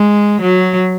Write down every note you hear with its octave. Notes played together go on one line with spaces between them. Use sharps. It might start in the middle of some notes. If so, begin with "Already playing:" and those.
Already playing: G#3
F#3